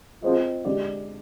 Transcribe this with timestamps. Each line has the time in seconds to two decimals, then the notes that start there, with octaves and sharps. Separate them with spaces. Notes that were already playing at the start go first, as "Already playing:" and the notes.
0.22 F3 G#3 C4 F4 C5 D#5
0.65 D3 G#3 D4 G4 D5